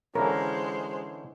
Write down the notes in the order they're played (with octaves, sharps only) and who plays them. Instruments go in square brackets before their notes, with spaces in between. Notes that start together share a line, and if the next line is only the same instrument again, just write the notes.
[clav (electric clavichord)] D3 E3 C#4 [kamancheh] G#3 C5 [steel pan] A#4